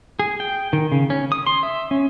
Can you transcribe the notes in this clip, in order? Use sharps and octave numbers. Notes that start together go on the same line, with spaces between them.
G#4
G5
D#3
C#3
C#4
D#6
C6
E5
C#4